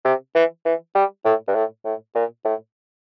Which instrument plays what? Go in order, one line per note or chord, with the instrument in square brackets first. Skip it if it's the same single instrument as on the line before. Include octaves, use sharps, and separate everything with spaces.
[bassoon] C3
E3
E3
G3
A2
G2
A2
A2
A#2
A2